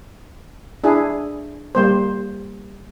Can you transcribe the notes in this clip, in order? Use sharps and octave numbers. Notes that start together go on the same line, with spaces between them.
D4 E4 G#4
G3 A#3 C5